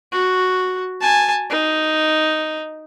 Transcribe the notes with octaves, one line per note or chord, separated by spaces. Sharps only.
F#4
G#5 A5
D#4